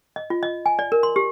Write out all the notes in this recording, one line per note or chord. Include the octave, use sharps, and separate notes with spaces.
D#5
F4
D#5
G#5
D5
A#4
C6
G4